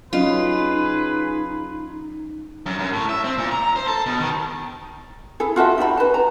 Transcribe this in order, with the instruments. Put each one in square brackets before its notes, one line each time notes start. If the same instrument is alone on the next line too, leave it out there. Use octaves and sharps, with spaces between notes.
[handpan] F#3 C#4 D#5 [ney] D#4 [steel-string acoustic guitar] F4 [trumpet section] G#4 B4 B5
[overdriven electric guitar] F#2
F#2
A2
E5
C4
A#2
A#5
C5
A4
B2
D#3
[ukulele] E4 G#4 A4
F4 F#4 A4 E5
D#4 G4 E5 B5
B4 A5
A#5